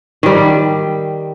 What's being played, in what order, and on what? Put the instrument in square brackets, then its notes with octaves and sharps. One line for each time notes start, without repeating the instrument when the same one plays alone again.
[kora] D#3 G3